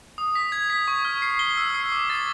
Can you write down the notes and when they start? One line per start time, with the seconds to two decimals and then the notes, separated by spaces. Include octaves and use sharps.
0.18 D#6
0.35 B6
0.52 G#6
0.70 B6
0.88 C#6
1.05 F6
1.22 C7
1.39 G7
1.57 E6
1.74 C7
1.92 D6
2.10 A6